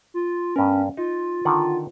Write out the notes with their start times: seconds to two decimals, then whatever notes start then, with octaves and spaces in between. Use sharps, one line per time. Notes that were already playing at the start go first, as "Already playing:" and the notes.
0.14 F4
0.56 G2 B3 C#4 A#4
0.97 D#4 F4
1.45 D3 D#3 F#5